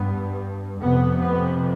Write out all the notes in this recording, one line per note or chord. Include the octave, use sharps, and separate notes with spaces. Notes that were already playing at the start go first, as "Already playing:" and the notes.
Already playing: G2 B3
F2 C3 B3
B3